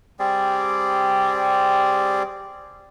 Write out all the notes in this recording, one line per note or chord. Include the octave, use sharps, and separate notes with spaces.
G3 C4 G#4 D5